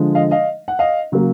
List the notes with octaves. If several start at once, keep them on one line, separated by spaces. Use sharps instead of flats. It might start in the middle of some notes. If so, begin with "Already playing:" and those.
Already playing: D3 F3 G#3
D#5 F5
D#5 F5
F#5
D#5 F5
C#3 F#3 A#3